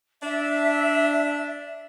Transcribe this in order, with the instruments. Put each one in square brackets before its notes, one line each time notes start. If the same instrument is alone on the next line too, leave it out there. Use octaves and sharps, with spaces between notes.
[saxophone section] D4 [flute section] E5